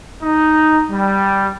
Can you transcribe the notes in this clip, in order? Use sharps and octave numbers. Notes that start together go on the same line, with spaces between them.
D#4
G3